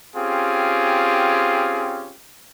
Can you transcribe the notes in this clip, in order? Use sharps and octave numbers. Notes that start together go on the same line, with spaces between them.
C4 C#4 F4 G4 G#4